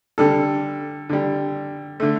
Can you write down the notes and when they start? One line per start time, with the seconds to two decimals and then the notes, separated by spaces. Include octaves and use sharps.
0.18 D3 G3 A4
1.09 D3 G3
2.00 D3 A3